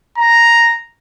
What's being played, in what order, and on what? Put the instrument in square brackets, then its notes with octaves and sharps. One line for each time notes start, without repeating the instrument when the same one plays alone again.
[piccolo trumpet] A#5